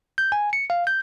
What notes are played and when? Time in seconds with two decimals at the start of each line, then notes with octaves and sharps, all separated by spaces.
0.18 G6
0.32 G#5
0.53 C#7
0.70 F5
0.87 G6